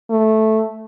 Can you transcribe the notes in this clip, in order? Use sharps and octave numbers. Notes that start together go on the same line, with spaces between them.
A3